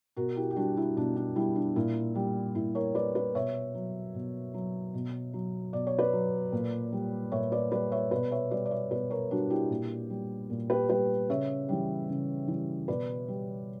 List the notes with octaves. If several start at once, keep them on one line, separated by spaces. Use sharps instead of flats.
B2 F#4 A#4
E4 G4
G4
G3 D4 F#4
E4
B2 D4
D4
G3 E4
D4
A#2 E4
G3
A#2 E4
A#4 C#5
G3 B4 D5
B4 D5
B2 C#5 E5
F#3
B2
F#3
B2
F#3
B2 D5
C#5
B4 D5
F#3
A#2
G3
A#2 C#5 E5
B4 D5
G3 B4 D5
C#5 E5
B2 B4 D5
C#5 E5
G3 B4 D5
D5
C#5 E5
B2 B4 D5
A#4 C#5
G3 D4 F#4
E4 G4
A#2
G3
A#2
G4 B4
G3 G4 B4
C#3 C#5 E5
E3 G3
C#3
E3
G3
B2 B4 D5
G3